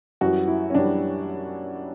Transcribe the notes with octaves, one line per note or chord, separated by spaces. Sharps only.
F#2 E3 G3 F#4
E4
C#4
F#2 E3 G3 D4